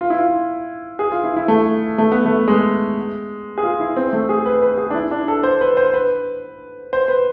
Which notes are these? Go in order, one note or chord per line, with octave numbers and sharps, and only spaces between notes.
F4
E4
F4
G#4
F4
E4
E4
A3
A3
B3
A3
G#3
G#4
F4
E4
C4
A3
G#4
B4
B4
G#4
D4
E4
D4
A4
C5
B4
C5
B4
C5
B4